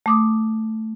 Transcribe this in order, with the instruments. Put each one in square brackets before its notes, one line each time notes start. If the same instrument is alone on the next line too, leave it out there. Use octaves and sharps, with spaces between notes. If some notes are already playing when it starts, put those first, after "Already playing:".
[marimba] A3 D6 D#6